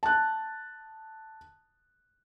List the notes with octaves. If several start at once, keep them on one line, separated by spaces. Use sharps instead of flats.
A5 F#6